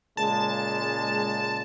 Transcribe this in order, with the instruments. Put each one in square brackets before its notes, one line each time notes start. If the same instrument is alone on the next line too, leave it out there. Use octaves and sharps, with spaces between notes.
[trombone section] A#2 C#3 G#3 [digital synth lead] A5